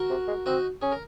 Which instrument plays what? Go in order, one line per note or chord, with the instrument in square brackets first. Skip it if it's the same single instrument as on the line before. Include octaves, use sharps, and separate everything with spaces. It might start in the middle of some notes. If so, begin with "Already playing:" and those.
Already playing: [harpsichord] F#4 A#4
[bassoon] C3
G#3
[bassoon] C4 [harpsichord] D#4 F#4
[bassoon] C#4 [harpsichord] G#4
[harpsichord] A#4